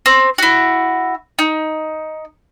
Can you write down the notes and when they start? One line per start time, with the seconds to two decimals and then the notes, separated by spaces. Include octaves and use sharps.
0.06 C4
0.38 E4 F#4
1.39 D#4